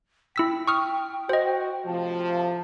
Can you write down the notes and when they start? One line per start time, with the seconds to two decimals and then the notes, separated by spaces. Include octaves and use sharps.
0.36 E4 G5 E6 B6
0.68 C#6 D#6 F6
1.29 F#4 C5 D#5
1.86 A2 C3 F3 A5